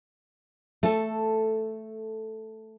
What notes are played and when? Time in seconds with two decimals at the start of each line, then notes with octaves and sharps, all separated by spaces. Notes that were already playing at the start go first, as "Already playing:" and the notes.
0.83 A3 A4